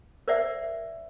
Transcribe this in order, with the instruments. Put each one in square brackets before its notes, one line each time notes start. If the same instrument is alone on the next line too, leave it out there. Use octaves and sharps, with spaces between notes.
[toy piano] A#4 C5 D5 E5 F#5